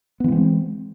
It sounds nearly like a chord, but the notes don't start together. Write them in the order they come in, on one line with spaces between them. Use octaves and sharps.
B3 E3 G#3 C4